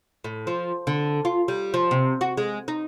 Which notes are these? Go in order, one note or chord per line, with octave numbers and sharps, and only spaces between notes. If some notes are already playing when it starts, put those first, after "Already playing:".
A2
F3
D3
F4
G3
F3
C3
F#4
G#3
D#4